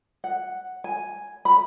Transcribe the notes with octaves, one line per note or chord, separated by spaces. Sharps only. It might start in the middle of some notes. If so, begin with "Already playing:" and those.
F#5
G#5
B5